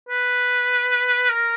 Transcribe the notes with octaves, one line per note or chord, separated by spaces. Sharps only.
B4
A#4